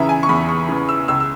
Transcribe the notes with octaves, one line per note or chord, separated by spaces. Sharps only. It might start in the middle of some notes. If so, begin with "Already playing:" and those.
Already playing: E2 C#3 E3 E5 A#5
G#5
C#6
E2 B5
C#6
C#3 E3
E6
C#2 E6
E6